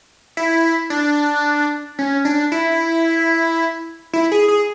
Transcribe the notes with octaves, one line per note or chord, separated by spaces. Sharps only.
E4
D4
C#4
D4
E4
E4
G#4
G#4